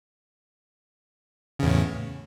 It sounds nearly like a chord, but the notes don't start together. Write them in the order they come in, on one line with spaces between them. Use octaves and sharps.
C#3 E2 A2